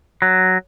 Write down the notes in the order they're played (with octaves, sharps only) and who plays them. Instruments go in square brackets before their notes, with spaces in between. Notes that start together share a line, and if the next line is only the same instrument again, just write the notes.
[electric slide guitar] F#3